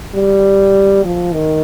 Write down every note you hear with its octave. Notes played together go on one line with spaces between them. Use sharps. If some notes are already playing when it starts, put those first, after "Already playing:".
G3
F3
D#3